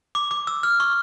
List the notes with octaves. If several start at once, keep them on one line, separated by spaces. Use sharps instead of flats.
D6
D6
E6
F6
C#6